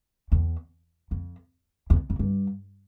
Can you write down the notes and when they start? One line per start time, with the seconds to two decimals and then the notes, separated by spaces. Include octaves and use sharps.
0.32 E2
1.11 F2
1.90 E2
2.10 F2
2.19 G2